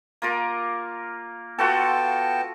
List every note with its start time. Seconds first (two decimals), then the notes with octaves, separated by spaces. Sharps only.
0.22 A#3 F4 A#4
1.59 B3 F4 F#4 A4 G5 A5